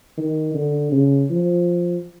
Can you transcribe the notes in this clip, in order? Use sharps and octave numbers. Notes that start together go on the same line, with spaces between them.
D#3
D3
C#3
F3